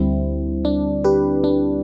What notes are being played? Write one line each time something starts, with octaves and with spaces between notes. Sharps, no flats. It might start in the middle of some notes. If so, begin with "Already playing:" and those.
Already playing: D2 D3 G3 C4 E4
D4
G4 B4
D4